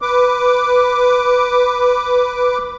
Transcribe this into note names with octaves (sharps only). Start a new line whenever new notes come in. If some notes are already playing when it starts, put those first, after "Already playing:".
B4 D6